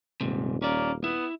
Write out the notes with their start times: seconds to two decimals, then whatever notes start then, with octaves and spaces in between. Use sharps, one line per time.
0.21 D#1 G#2 C3
0.62 A#3 C#4 D5
1.04 B3 E4